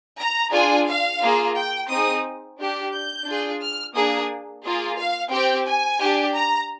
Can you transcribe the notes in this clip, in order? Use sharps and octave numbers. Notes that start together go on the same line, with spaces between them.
A#5
D4 F4 G#4 G#5
F5
A#3 F4 G#4
G5
C4 D#4 G#4 D#6
D4 G4
G6
D4 F4 G#4
F6
A#3 D4 G#4 D#6
A#3 F4 G#4
F5
C4 G4 G5
G#5
D4 G4
A#5